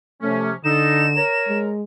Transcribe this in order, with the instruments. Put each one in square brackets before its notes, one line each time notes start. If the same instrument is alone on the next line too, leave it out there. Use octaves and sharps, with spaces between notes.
[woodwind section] C3 F3 C#4 [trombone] A3
[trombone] D3 [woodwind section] D#4 A4 D#5 [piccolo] E7
[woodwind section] A#4 C#5 A#5
[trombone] G#3